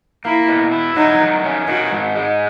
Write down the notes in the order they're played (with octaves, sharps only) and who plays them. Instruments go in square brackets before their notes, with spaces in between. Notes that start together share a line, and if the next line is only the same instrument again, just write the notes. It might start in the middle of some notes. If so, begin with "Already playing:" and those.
[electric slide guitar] A#3 [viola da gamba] E4
[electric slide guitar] B2
E4
[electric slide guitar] F#3 [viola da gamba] D#4
[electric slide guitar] D#3
C#4
[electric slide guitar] D#3 [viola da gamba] F#4
[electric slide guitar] G#2
G#3